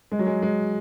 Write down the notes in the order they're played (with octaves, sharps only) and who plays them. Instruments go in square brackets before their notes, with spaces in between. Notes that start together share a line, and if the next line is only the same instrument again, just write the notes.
[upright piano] G#3
F#3
G#3
G#3